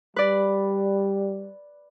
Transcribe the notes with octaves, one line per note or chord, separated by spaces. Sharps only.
G3 B4 D5